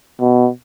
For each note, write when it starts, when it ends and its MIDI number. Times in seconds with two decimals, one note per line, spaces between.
0.20 0.49 47